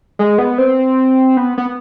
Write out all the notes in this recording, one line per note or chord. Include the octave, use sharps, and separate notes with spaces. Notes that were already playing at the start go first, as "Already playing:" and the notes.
G#3
B3
C4
B3
B3